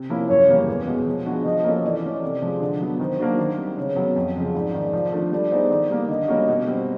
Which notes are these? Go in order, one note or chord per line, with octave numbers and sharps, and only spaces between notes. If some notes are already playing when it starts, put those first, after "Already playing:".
Already playing: C3
F3 A#3 C#4 E4
F#2 C#5
C#3 E3 G3 A#3
E2
B2 G#3
F3
G#3 B3 D4 F#4
F3 D#5
A#3 C#4 F#4 A4
E3 D5
A3 C#4
C3
F3 G#3
D3
F#3 B3
D#3 C5
F#3 A#3 D4 F#4
D#3
G3 C4
C#3 C#5
F#3 B3
F2
C#3 F3 G#3
G#2 D5
D#3 G#3
F3
A3 D4 F4
G3 D5
B3 D#4 G#4 C5
D#3
G3 A#3
D3 D#5
G3 A#3 C#4 F#4
B2
G3 C4